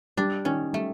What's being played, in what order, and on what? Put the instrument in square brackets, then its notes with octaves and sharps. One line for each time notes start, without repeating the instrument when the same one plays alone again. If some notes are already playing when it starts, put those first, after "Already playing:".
[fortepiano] G3 [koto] D4
[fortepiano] D#3 [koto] C#4
[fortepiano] G3 [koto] A3